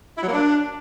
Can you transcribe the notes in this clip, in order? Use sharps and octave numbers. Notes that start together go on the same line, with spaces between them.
E4
F#3
A#3
D4